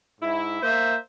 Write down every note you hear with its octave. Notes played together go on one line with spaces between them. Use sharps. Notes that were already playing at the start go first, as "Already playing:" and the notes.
G#2 E4
A#3 C5 E5